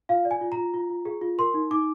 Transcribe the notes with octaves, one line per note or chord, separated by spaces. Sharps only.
F4 F5
D5
G#5
F4
A#5
F4
F4
F4
G#4
F4
A#4 C6
D#4
D#4 D6